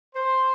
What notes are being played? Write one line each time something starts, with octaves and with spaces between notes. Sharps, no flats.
C5